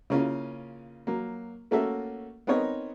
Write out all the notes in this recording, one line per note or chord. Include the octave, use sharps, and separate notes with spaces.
C#3 A#3 C#4 E4 F4
F#3 A#3
A3 A#3 C#4 F#4 A4 E5
B3 C4 D#4 A#4 C#5 D#5